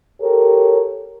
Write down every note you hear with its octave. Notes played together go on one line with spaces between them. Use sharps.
G4 A4 A#4 C#5